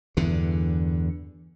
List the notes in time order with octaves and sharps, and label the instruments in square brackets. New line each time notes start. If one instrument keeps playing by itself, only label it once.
[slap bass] E2 G2 D3